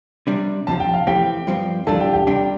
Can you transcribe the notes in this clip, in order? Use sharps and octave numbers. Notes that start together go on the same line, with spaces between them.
C3 G3 D4
F2 C3 F3 A5
G5
F5
E3 A3 C4 G4 G5
G2 F3 C4
E3 G3 D4 F4 A4 A5
G4 G5
G4 G5
C3 G3 D4 G4 G5